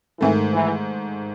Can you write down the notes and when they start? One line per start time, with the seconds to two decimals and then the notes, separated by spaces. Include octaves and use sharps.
0.20 G#2 D#3 E3 A3
0.51 E3